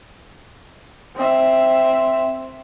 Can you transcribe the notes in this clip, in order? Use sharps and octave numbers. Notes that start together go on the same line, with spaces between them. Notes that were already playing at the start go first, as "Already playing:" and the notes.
C4 E5